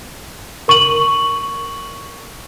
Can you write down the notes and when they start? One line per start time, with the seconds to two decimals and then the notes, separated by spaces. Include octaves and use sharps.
0.68 A#4 C#6 D#7 F#7